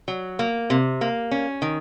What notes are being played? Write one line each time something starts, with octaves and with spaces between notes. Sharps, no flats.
F#3
A#3
C3
A#3
C#4
D#3